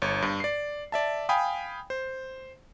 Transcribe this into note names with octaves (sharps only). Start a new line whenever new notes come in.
G1 C#5
G2
D5 C7
D5 E5 A5
F5 G5 G#5 B5 D#6
C5